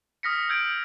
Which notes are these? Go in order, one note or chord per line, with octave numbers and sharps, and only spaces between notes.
D#6 F6 A#6 B6 C#7
E6 G6 G#6 D7